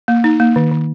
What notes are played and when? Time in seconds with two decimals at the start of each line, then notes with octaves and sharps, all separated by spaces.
0.08 A#3
0.24 D#4
0.40 A#3
0.56 D#3
0.71 D#3